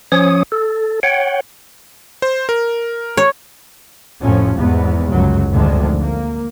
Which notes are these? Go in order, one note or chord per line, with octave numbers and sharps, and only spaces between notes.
F3 C#4 C#5 D#6
A4
C#5 F#5 G5
C5
A#4
C#5
F1 F2 A2 F3 C#4
E2 G#2 B3
G1 C#2 F#2 C#3 F#3
G#1 D2 D3 D#3 F3 G#3
A#3